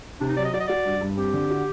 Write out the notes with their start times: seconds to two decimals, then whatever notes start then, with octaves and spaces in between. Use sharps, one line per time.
0.20 C3 D4
0.29 D#4
0.37 F#3 D5
0.44 D#5
0.54 F#4 D5
0.60 D#5
0.67 F#4 D5
0.85 G2
1.01 G2
1.17 C4 G4
1.34 D3
1.51 F#4